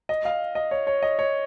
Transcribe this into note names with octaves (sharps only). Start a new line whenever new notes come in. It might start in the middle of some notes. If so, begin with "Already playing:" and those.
D#5
F5
D#5
C#5
C#5
D#5
C#5